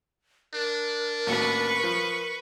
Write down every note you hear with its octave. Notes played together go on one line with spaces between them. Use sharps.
D4 A#4
A1 D#2 F#4 B4 C#6
F3